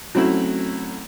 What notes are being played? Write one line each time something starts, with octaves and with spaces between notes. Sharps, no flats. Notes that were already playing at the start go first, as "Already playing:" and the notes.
F#3 A3 C4 C#4 E4